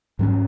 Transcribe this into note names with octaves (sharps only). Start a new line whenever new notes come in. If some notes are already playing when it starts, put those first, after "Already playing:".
G#2 F#3 C#4